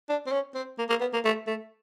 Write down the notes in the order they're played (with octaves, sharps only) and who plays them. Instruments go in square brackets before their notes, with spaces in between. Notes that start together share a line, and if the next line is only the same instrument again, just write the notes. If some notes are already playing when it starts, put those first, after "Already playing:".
[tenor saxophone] D4
C4
C#4
C4
A#3
A#3
B3
A#3
A3
A3